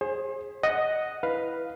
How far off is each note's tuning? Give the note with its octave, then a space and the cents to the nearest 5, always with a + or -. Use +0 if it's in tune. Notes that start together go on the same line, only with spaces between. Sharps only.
G#4 +0 C5 +35
D#5 +0 F#5 +0
E4 +0 B4 +0 F5 +0